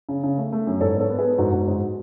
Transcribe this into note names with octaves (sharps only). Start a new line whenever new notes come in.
C#3
C#3
A3
A3
F#2
G#2 A4 C#5
B3 A4 C#5
B3
G#4 B4
B3
G#2 F#4 A4
G#2
G#2